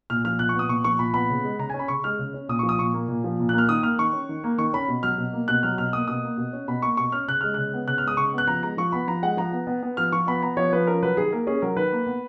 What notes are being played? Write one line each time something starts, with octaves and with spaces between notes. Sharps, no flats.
A#2 F6
F3 F6
A#2 F#6
C#6
B3
D#6
A#2 C#6
F3 C#6
A#2 B5
B3 B5
C#3
G#3
C#3 A#5
G#5
C#4
B5
C#3 C#6
G#3 F6
C#3
C#4
A#2 D#6
C#6
F3
D#6
A#2 C#6
A#3
A#2
F3
A#2
A#3 F#6
F6
D#3 D#6
A#3 F6
D#3 C#6
C#4
D#3
A#3
D#3 C#6
C#4 B5
B2
F#3 F6
B2
A#3
B2 F#6
F#3 F6
B2 F6
A#3 D#6
B2 D#6
A#3
B2
C#4
B2 B5
A#3 C#6
B2 C#6
C#4 F6
C#3 F#6
G#3 F6
C#3 F#6
B3
C#3 F#6
F6
G#3 D#6
C#3 C#6
B3 F#6
F3 A#5
G#3 A#5
F3 C#6
B3 B5
F3 A#5
G#3 F#5
F3 A#5
B3
B3
B3
F3 F6
F3 C#6
B3 B5
B3 A#5
F3 C#5
F3 B4
C#4 A#4
F#3 B4
D#3 G#4
A#3 A#4
C#4 G#4
F#3 A#4
D#3 B4
A#3
B3